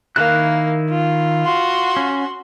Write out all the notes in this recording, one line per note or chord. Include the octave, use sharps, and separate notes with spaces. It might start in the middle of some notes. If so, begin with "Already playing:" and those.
D#3 A#3 E4 F#6
F4
F#4 C6
C#4